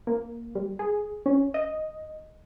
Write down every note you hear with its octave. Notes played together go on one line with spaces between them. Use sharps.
A#3
G3
G#4
C#4
D#5